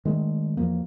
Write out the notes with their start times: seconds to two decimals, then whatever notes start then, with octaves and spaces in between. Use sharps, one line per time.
0.05 D#3 G#3 A3
0.57 E2 F3 A#3